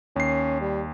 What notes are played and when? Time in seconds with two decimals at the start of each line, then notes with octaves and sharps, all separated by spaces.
0.16 D#2 C#4 C7
0.61 G3